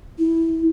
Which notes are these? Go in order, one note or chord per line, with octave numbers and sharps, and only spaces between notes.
E4